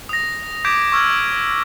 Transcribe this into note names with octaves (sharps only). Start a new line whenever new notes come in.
D#6 A#6
D6 G6 G#6 B6 D7
C#6 E6 F6 G#6